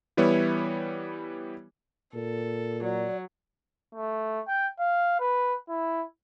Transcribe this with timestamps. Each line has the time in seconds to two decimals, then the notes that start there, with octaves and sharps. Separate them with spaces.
0.17 E3 G3 B3 E4 C#5
2.15 A#2 A4
2.84 F#3 D5
3.95 A3
4.48 G5
4.79 F5
5.19 B4
5.69 E4